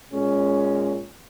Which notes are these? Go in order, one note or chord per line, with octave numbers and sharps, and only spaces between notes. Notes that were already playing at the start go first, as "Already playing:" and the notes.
A#2 G#3 C#4